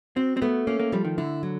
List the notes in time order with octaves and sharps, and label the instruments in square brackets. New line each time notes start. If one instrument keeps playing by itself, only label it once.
[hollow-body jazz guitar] C4 [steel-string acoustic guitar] F#4
[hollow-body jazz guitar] C4
[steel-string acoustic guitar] A3 [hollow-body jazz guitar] B3
[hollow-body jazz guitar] A#3 [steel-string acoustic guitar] C#4
[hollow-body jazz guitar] A#3
[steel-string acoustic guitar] F3 [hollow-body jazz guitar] G3
[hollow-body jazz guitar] D#3
[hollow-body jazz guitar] D3 [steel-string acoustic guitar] E4
[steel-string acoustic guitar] F#3